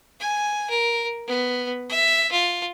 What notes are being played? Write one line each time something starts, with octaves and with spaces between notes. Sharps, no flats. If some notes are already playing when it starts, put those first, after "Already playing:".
G#5
A#4
B3
E5
F4